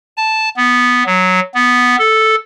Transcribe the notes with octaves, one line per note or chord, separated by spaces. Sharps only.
A5
B3
F#3
B3
A4